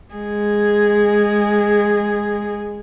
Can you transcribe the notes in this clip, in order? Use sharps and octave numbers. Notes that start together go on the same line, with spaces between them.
G#3 G#4